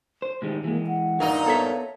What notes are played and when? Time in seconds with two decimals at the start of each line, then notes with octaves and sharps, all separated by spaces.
0.22 C5
0.42 A2 D#3 G#3 G4
0.64 E3 G#3 A#3
0.87 F#5
1.20 G2 A#2 D#4 A#4 F5
1.46 B3 A4 C#5 E5